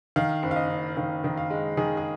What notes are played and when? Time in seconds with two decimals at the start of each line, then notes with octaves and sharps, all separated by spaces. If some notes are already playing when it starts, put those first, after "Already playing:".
0.16 D#3 F5
0.43 F#1
0.51 F5
0.56 D#5
0.70 F#1
0.97 D#3 F5
1.24 D#3
1.37 F5
1.50 G#3
1.77 D#3 G#4
1.97 G#4